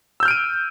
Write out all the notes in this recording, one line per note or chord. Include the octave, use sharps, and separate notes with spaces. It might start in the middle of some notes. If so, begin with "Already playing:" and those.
E6 F6 G6 D7 D#7